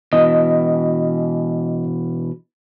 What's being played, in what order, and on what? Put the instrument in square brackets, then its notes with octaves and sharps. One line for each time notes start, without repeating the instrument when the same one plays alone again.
[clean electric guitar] B2 E3 [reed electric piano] D#5